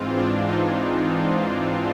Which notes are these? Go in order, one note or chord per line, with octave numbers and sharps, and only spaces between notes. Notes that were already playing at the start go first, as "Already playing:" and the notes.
Already playing: G#2 E3 G#3 C4 F4
D4
D#4